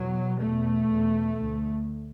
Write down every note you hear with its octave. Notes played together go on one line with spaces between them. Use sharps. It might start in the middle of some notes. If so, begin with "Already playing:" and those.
Already playing: E2 B2 F#3
E2 B2 A3
E2 B2
D2